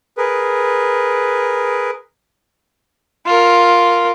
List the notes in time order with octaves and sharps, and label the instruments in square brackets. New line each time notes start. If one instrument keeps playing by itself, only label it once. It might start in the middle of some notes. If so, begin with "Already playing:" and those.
[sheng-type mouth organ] G#4 A#4 B4
[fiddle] F4 A#4